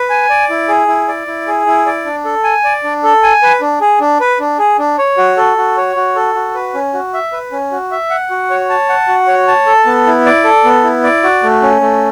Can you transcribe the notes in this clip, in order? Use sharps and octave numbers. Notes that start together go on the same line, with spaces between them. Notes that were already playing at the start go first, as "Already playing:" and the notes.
Already playing: B4
G#5
D5
E4
G#4
E4
D5
E4
G#4
E4
D5
D4
A4
G#5
D5
D4
A4
G#5
B4
D4
G#4
D4
B4
D4
G#4
D4
C#5
F#4
A4
F#4
C#5
F#4
A4
F#4
B4
C#4
F#4
E5
B4
C#4
F#4
E5
F#5
F#4
C#5
A5
F#5
F#4
C#5
A5
A4
B3
E4
D5
A4
B3
E4
D5
F#4
A3
C#4
A3